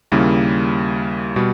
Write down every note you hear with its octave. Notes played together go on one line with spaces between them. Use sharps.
D#2 C#3 G3 A#3 E4
B2 G3